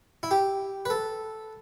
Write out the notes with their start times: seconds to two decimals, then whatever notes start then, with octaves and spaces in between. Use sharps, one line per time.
0.23 E4
0.31 G4
0.85 B4
0.90 A4